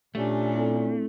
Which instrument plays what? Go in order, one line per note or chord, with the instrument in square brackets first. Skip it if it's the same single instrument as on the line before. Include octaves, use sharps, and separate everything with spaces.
[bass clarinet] A#2 [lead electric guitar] A3 [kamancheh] C#4 D4 [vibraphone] G4
[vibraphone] C4 E4 A4